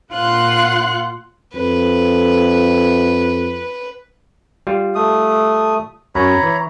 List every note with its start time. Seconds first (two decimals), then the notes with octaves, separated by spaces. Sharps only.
0.13 A#2 F4 F#5 C6 F#6
1.55 F2 B4
4.67 G3 F4
4.95 A3 D#6
6.15 F#2 C#5 A#5 B5
6.43 E3